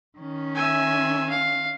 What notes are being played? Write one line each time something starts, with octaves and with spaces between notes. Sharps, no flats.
D#3 C#4
E5 G#5
F5